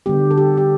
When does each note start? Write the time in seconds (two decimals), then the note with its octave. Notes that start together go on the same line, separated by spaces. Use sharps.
0.06 D3 G3 B3 G4
0.31 A4
0.38 G4
0.58 G4